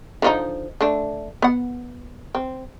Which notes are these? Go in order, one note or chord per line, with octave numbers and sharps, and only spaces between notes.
D3 F3 D#4
D3 A3 D4
B3 F#5
C4